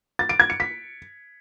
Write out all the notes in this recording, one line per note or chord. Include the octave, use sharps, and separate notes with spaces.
A6
D7
G#6
C#7
B6